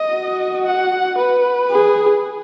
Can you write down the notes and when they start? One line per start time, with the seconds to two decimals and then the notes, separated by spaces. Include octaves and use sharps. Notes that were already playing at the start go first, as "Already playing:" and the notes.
Already playing: D#5
0.13 F#4
0.66 F#5
1.18 B4
1.71 G#4